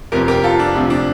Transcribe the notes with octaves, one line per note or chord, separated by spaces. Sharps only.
G1 F2 C3 F3 G4 A#4
G4 A#4
F4 A4
D4
D2 C3 F3
D4